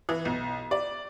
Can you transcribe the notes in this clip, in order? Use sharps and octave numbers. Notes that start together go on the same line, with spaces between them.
E3
B1
D5